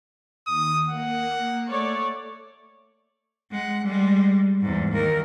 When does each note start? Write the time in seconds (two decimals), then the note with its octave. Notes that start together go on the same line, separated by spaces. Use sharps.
0.47 D#2 D#6
0.89 A#3 F#5
1.70 A3 C#5 D5
3.51 G#3 F#5
3.83 G3 G#3
4.61 E2 G#2
4.91 D#2 A#4